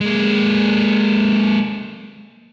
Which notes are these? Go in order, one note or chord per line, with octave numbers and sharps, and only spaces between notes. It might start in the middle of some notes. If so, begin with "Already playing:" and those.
G#3 A#3